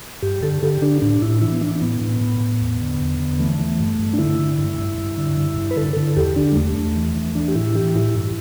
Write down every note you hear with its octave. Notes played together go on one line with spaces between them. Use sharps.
G2 G4
D3 A4
D3 G4
D3 D4
A2 D4
A2 E4
E3 E4
B3
E3 D4
D4
A2 B3
A2
A2
A2
E2
D3
E2
D3
E3 A3
E3
G2
G2
D4
D3 E4
D3
G2
G2
G2
D3
G2
G2
B4
D3 A4
D3 A4
E2 G4
D3 D4
G3
E2 A3
E2
E3
E3
E3 D4
G4
A2 E4
E3 G4
A2 E4
G2